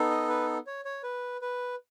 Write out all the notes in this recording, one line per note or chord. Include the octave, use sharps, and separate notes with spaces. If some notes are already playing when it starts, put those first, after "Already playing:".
Already playing: B3 D#4 A4
D#5
B4
C#5
C#5
B4
B4